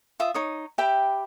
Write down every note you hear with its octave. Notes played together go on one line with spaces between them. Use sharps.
F4 E5 D#6
D#4 C#5 D#6
G4 E5 G5 B5